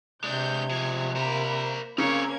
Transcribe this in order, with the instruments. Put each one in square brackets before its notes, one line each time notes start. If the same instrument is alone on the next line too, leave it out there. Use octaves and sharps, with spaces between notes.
[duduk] C3 [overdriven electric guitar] G#3 D4 [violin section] G6
[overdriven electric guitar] F3 G#3 [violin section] G#6
[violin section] A#3 B5 [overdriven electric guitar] A#4 C5
[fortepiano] C#3 [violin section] A#3 C#4 G#6 [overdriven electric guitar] C4 C#5